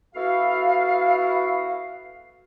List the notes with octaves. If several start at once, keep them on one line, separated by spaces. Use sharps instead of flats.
B3 E4 F#4 A4 F5